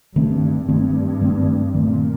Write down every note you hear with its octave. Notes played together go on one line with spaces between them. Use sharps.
G2 D#3 A3 C4
G2 D#3 A3 C4
D#3 A3 C4
A#2 D#3 A3 C4